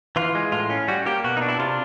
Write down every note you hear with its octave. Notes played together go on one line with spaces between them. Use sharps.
E3 F4
G#3
A2 F4
C#4
G3 F#4
A#3 G4
B2 F#4
D#4
D4
E4
C3 F4